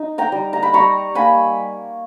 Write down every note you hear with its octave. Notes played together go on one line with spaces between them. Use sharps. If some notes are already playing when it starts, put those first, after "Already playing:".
Already playing: D#4
G5 A#5
G3
A#5
B5
G3 A#5 C#6
A#3 G#5 B5